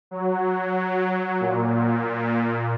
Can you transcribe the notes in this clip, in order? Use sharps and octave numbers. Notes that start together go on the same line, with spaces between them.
F#3
A#2